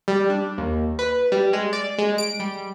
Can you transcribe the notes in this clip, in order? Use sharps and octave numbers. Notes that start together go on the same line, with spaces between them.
G3
D4
D#2
B4
G3
G#3
D5
G#3
D7
G3